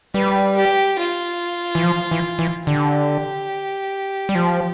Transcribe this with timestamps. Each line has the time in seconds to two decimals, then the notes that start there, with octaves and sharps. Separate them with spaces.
0.14 G3 B4
0.57 G4
0.99 F4
1.75 E3
1.83 F3
2.11 E3
2.39 E3
2.67 D3 G4
4.29 G3
4.35 F3